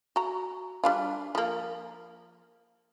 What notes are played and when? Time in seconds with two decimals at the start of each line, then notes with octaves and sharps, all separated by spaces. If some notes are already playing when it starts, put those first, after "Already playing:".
0.16 F#4 A#5
0.84 G3 D4 F4
1.35 F3 A#3